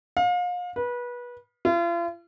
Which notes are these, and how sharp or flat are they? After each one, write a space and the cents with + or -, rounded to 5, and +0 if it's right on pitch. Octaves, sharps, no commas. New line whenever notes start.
F5 +35
B4 -25
F4 -40